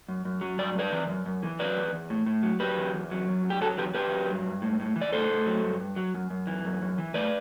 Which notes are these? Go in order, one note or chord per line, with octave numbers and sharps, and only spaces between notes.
F#2
F#2
F#3
G2 D5
G2 B4 D5
E3
F#2
F#2
E3
F#3 B4 D5
E2
E2
A2
A2
F#3
F#3 G4 B4
E2
E2
F#3
F#2
F#2
G4
F#3 F#4 A4
E2 G4 B4
E2 G4 B4
F#3
G2
G2
A2
A2
E3
D5
A2 A4 C5
A2
F#3
G2
G2
F#3
F#2
F#2
E3
F#2
F#2
E3
A2 B4 D5